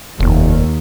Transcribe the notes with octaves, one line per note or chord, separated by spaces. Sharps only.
F1 D#2